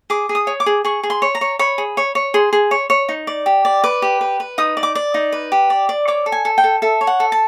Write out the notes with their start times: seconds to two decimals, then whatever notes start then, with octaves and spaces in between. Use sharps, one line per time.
0.10 G#4 D6
0.29 G#4
0.35 D#6
0.47 C#5
0.60 D6
0.66 G#4
0.85 G#4 C#6
1.03 G#4
1.10 C6
1.22 C#5
1.35 A#5
1.41 C#5
1.59 C#5 B5
1.78 G#4
1.97 C#5
2.15 C#5
2.34 G#4 C6
2.53 G#4
2.71 C#5
2.90 C#5
3.09 D#4
3.27 D5
3.46 G4
3.65 D5
3.84 B4 D6
4.02 G4
4.21 B4
4.40 B4
4.58 D#4 D#6
4.77 D5
4.83 D6
4.95 D5
5.14 D#4
5.32 B4
5.52 G4
5.70 D5
5.89 D5
6.08 C#5 D6
6.26 A4
6.32 G#5
6.45 A4
6.58 G5
6.64 A4
6.82 A4 E5
7.01 C#5
7.07 F#5
7.20 A4
7.32 A5